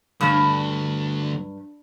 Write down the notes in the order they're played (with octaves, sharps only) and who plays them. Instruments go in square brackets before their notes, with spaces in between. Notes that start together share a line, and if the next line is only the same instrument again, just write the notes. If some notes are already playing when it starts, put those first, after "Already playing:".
[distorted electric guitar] D2 [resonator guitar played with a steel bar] G2